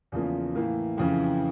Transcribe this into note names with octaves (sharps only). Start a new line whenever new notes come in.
E2 C#3 F3 A#3
A2 E3 A#3
F2 C#3 E3